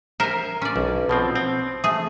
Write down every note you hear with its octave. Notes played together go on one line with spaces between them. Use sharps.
A#4 C5 E5 G#5
C#4 D5
B1
B2 F3 C4
C4
A3 G#4